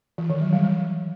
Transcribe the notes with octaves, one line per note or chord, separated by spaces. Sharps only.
E3
D#3
F#3
G3
G3